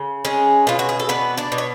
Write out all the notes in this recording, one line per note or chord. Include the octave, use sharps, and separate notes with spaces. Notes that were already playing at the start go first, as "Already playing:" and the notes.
Already playing: C#3
G#3 C#4 G#4
B2 F4
F#4
G#4
A4
B3 D4 B4
D4 D5
B2
C#5